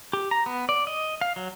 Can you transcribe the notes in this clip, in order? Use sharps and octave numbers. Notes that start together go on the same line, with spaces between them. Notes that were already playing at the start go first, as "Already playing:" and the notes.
G4
A#5
B3
D5
D#5
F5
F#3